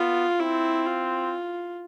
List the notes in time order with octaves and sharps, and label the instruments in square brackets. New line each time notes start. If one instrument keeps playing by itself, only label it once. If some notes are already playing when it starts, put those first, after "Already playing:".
Already playing: [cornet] B3 [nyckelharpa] F4
[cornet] C4 [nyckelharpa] E4
[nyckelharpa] F4